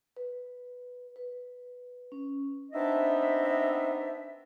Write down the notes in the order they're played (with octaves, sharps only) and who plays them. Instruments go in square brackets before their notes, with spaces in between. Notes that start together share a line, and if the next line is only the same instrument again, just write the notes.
[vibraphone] B4
B4
C#4
[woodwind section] B3 C4 D4 D#4 D#5 E5